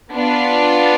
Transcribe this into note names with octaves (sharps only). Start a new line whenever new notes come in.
B3 D4 F4